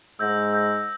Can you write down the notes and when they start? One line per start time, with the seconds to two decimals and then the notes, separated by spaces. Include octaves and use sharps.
0.19 G#2 E6 G6 A#6
0.53 E6 G6 A#6